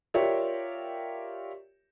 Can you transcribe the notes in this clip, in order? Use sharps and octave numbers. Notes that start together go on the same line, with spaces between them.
F4 G4 A#4 C#5 D5 E5